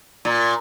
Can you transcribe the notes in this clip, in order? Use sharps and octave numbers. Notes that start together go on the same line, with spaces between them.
A#2